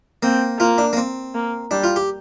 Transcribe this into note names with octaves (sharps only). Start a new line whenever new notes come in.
A#3 C4
A#3 F4
D4
A#3
C4
A#3
G3 D4
F4
G4